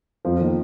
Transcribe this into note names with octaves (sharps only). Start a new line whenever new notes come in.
F2 F3
D#3 A#3